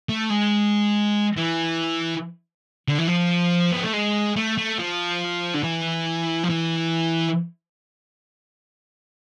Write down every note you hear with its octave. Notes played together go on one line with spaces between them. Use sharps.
A3
G#3
E3
D3
E3
F3
B3
A3
G#3
A3
A3
F3
D3
E3
F3
E3